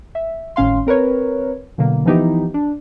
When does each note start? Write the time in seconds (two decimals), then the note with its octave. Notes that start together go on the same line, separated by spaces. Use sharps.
0.15 E5
0.56 G#1 A2 C#4 F5 C6
0.86 C4 A#4 B4 C#5
1.78 B2 D3 F#3 A#3
2.05 E3 F3 B3 D#4 E4 G4
2.54 D4